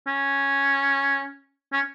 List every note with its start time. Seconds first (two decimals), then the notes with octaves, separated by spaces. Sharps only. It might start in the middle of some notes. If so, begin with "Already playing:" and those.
0.07 C#4
1.73 C#4